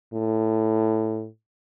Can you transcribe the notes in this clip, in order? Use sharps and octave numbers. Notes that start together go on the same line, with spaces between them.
A2